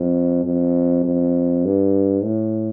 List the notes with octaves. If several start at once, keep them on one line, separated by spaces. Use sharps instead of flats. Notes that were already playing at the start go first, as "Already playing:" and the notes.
Already playing: F2
F2
F2
G2
A2